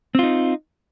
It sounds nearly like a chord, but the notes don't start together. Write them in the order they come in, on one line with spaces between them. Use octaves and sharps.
C4 F4 D#4